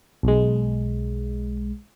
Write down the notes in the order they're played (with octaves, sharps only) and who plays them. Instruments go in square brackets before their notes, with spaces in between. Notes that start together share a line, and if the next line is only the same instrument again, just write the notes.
[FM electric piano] B1 G#3